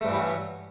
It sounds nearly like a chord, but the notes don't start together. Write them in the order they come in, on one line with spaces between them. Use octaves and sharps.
A3 G2 E3 G3 F#3